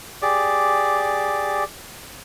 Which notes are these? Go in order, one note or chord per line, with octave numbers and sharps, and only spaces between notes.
G4 G#4 D5 D6